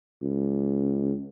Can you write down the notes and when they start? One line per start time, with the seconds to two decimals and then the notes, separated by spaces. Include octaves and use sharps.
0.22 C#2